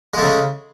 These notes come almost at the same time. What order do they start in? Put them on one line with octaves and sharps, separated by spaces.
G#3 A3 C#3